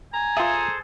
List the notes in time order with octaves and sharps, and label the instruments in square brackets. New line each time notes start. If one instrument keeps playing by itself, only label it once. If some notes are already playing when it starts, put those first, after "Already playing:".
[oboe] G#5 [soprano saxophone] A#5
[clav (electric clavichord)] F4 E5 [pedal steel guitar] G#4 A4 C5